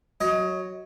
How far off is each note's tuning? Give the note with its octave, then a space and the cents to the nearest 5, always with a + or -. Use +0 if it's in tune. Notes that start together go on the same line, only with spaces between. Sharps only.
F#3 +0 D#5 +25